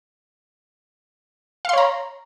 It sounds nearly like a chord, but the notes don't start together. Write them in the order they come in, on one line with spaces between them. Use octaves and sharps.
F5 C6 C#5 A#5